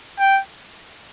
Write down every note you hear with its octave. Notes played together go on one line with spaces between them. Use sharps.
G5